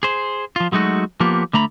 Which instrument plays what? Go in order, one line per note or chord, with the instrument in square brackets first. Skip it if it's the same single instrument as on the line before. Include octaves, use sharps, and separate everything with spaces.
[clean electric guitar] G#4 C5
F3 F4
F#3 G#3 A3 D#4 F#4
F3 A#3 B3 G4
D3 A3 A#5 B5